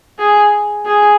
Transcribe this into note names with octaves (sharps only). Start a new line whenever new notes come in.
G#4
G#4